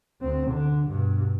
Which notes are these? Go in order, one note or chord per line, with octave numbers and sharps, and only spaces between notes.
D2 C4
D3
G2 B2